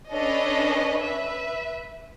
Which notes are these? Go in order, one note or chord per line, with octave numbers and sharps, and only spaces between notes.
C#4 D4 A4 B4 C#5 D#5
B4 E5